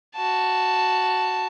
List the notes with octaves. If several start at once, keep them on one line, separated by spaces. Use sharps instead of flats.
F#4 A5